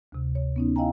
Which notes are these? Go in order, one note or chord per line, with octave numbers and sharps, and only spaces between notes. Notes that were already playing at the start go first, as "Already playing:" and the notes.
D2 C3
C#5
B3 C#4 D#4
E4 D#5 F5 G5 G#5 A#5